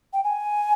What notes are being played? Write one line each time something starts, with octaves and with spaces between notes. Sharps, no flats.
G5
G#5